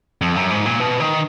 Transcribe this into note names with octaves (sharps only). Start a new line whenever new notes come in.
F2
F#2
G#2
A#2
B2
D#3